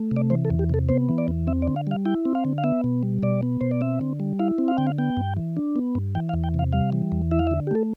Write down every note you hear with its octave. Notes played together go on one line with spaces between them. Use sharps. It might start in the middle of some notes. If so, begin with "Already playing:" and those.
Already playing: A3
C3
D5
E3 C5
A4
E2
G4
C3 A4
B3 C5
E3
D5
E2
C4 E5
D5
D3
F5
G3 F5
E4 G5
C4
F5
D3
F5
B3 E5
B2
G3
B2 D5
B3
B2 C5
D5
C4 E5
D3
G3
E4 F5
C4
F5
D3 G5
F5
B3 G5
G2
E3
D4
B3
G2
E3 G5
F5
E2
G5
C3 F5
G3 F5
E3
E2
E4 E5
F5
D3 E5
G4
A3 A4